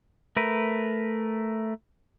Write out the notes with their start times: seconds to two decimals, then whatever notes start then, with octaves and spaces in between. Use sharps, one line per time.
0.37 A3 A#4 B4